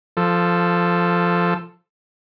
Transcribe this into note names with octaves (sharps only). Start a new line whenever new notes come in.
F3 A4